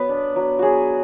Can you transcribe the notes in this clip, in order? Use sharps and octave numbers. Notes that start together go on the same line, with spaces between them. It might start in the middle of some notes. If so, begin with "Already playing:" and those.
Already playing: F#3 B3 B4
D4
F#3
F#3 F#4 G#4